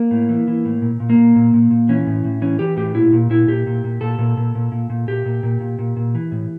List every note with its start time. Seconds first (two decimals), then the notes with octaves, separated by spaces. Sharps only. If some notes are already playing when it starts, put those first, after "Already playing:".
Already playing: A#3
0.11 A2
0.29 E3
0.48 E3
0.65 A2
0.82 A#2
1.00 A#2
1.10 A#3
1.17 A#2
1.36 A#2
1.54 A#2
1.71 A#2
1.89 E3 C#4
2.07 A2
2.24 A2
2.42 E3 C#4
2.59 E3 G4
2.77 A2 G4
2.95 A#2 E4
3.13 A#2
3.30 A#2 E4
3.48 A#2 G4
3.67 A#2
3.84 A#2
4.01 A#2 A4
4.19 A#2
4.37 A#2
4.55 A#2
4.72 A#2
4.90 A#2
5.08 A#2 G4
5.26 A#2
5.43 A#2
5.60 A#2
5.79 A#2
5.97 A#2
6.15 E3
6.31 A2